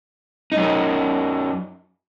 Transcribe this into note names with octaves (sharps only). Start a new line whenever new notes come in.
F#2 D#4